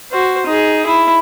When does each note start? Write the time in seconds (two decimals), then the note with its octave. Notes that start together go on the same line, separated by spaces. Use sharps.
0.12 F#4 C5
0.46 D#4 G#4
0.87 E4